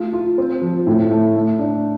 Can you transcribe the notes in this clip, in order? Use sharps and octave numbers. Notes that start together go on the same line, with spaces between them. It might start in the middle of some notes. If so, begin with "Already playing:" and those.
Already playing: A3 F4
F4
C4
F3
A2
A3
A3
D4